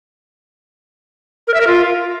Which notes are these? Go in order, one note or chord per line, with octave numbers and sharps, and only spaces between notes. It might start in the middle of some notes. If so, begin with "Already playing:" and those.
A#4
E5
A#4
F4